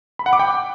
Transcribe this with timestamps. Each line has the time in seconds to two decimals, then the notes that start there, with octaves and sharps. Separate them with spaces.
0.19 B5
0.26 F#5
0.33 D6
0.39 G5